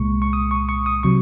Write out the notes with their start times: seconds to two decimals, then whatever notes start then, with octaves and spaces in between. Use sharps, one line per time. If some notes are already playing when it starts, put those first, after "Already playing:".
Already playing: C2 A#2 G#3 C#6
0.22 C#6
0.33 D#6
0.51 C#6
0.69 C#6
0.86 D#6
1.03 C3 F#3 C#6